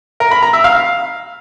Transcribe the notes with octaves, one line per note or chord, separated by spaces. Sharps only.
A#4
B5
A#5
E5
F5